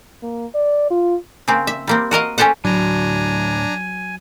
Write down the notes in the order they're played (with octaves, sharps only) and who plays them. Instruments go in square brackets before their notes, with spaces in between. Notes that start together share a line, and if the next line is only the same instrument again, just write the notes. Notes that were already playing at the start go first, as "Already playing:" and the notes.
[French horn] A#3
D5
F4
[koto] C#3 A#3 C4
E5
G3 A#3 C4
F#4 A#4 D#5 F5
C#4 G4 A4 C5 F#5
[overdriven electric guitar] D2 A2 [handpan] F#3 [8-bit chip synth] D4 A#5 [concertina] G#5